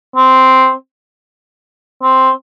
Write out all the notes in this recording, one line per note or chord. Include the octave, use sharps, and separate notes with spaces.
C4
C4